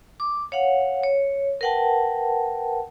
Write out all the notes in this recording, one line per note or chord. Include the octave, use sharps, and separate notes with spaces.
D6
C#5 F5 F#5
C#5
A#4 B4 F#5 G5 A5